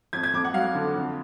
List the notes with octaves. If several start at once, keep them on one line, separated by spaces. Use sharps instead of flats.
F2 G#6
G#6
F2 D6
F#5
F#3 F5
D3
F2